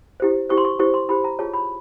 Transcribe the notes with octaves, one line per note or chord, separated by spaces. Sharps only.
E4 G4 C5
E4 G4 C5 C#6
C6
C#6
E4 G4 C5 C#6
C6
E4 G4 C5 B5
A#5
F4 G#4 C#5 A5
B5